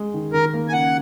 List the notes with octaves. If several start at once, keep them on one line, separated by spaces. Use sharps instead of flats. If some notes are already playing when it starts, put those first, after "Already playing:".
Already playing: G#3
D#3
D#3 A#4
A#3
G#5
C#3 F#5